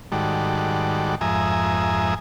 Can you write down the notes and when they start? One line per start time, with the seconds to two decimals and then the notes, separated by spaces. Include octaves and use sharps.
0.12 G#2 D#3 G3 F#4 A4 D5
1.21 F2 G#2 E5 G#5 A#5 D#6